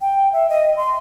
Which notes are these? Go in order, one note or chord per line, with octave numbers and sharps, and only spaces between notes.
G5
E5
D#5
C6